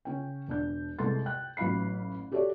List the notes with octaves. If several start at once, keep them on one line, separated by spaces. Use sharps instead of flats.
C#3 C#4 G5
E1 D4 G6
C2 G#3 A4 B4 C6 A6
G5 F#6
A1 F#3 D#4 F5 B5 C7
F#4 G4 A4 C#5 D5 E5